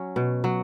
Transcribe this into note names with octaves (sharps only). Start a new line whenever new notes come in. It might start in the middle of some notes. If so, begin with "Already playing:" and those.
Already playing: F#3 C#4
B2
F#3